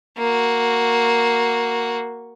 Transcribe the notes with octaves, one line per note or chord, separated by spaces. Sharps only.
A#3 F#4